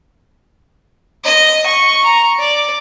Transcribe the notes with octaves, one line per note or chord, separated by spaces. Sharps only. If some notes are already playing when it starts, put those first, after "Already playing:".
D#5
C#6
A#5
D5